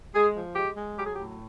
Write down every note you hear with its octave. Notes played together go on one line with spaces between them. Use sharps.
G#3 G#4
F3
G#3 G4
G#3
F#3 G4
G#4
G4
A2